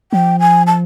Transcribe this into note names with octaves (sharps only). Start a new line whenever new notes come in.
F3 G5
G#5
A5